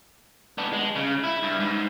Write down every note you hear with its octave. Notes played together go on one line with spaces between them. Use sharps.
B3 D4
G#3
C#3
E4
G2
G#2